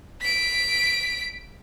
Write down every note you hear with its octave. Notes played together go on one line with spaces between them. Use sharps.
B6 D7